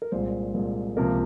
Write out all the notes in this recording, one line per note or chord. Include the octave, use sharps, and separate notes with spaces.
A#4
C2 A#2 G#3 C5
C2 A#2 G#3
C#2 C3 F3 A#3 A#4